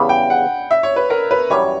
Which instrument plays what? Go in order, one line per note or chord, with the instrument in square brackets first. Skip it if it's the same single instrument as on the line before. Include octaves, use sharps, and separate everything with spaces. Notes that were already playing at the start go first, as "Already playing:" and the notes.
Already playing: [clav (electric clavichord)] E2 C#3 G3 [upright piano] B5
[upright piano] G5
F#5
E5
C#5
B4
A#4
B4
[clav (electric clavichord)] F#2 E3 G3 [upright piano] C#5